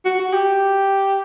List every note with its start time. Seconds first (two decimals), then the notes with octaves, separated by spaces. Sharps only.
0.05 F#4
0.19 F#4
0.33 G4